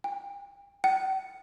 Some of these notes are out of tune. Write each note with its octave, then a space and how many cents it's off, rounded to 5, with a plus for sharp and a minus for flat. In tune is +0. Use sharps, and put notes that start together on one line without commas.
G5 +35
G5 -45